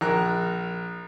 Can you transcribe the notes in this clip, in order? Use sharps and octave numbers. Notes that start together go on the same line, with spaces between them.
A#1 A#4 A#5 F#6